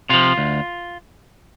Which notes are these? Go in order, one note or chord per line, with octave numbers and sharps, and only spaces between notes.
C3 F3 F4
D2